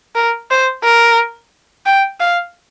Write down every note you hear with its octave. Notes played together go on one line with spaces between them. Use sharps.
A#4
C5
A#4
G5
F5